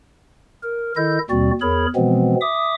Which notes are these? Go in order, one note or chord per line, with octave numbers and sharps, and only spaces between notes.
A#4
D#3 E4 A4 D#5 G6
D#2 B2 G3 C4 F#4 D5
E2 G#4 A#4 C#5 B5
B2 E3 F3 G#3 B3 C4
E5 D6 D#6